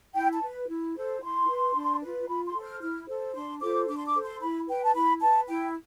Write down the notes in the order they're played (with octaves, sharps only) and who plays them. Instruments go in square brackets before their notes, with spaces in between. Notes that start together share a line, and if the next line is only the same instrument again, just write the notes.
[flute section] E4 G5
A5
B4
E4
A4 C5
E4 C6
B4
D4
F4 B4
F4 B5
C6
A4 C5
F6
E4 F6
A4 C5
D4 C6
F4 A4 C5 D6
D4 D6
C6
D6
A4 C5
C6
E4 B5
B4 G5
A5
E4 B5
B4 A5
E4 G5